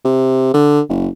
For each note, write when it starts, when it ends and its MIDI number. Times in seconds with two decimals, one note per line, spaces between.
0.04 0.51 48
0.54 0.80 50
0.89 1.08 30